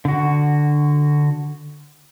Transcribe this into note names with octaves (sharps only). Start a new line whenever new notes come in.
D3 F#4